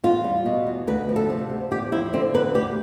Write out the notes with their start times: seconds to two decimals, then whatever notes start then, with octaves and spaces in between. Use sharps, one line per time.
0.04 E2 F4
0.24 G3
0.46 B2
0.67 E2
0.87 D2 B4
1.09 F3
1.16 A4
1.30 C3
1.50 D2
1.71 E2 G4
1.92 F3 E4
2.13 D3 C4
2.34 E2 B4
2.54 D2 G4